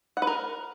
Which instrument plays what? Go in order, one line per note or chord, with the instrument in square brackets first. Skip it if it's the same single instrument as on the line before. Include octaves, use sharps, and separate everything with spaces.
[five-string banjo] F#5
B4
A#4